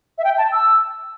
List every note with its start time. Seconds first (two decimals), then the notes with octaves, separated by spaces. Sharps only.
0.18 E5
0.24 G5
0.38 A5
0.52 E6